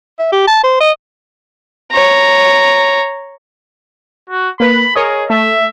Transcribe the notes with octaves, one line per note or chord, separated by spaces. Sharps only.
E5
G4
A5
C5
D#5
C#5 A#5
F#4
A#3 B4 B5
G#4 A#4 C#5 D#5
A3 E5